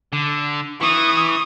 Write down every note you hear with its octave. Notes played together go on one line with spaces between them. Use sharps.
D3
E3 C#6 D#6